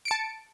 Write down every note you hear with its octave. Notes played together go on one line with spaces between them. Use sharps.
A5 C#7 D7